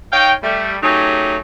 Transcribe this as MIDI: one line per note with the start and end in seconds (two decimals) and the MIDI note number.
0.13 0.33 63
0.13 0.33 73
0.13 0.33 77
0.13 0.33 79
0.43 0.77 55
0.43 0.77 57
0.83 1.37 54
0.83 1.37 57
0.83 1.37 61
0.83 1.37 63
0.83 1.37 67
0.83 1.37 68